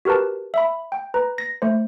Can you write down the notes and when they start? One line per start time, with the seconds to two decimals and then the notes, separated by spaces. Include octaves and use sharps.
0.05 F#4 G4 A#4 B4 A5
0.54 E5 B5
0.92 G5
1.14 B4 A#5
1.38 A#6
1.62 A3 C5